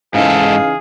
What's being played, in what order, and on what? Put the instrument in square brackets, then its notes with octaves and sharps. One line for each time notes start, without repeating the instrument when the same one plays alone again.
[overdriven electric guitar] G#2 A4 [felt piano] C#3 E3 D#4 [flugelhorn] G#4 [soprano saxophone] F5